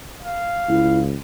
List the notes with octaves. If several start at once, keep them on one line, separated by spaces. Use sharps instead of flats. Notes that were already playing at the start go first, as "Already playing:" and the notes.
F5
C#2 E4